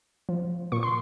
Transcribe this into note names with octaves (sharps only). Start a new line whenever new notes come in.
F3
A#2 C#6
C6